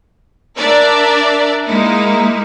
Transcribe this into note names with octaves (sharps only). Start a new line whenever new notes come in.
D4 A#4 D5 E5
G#3 A#3 D#4 E4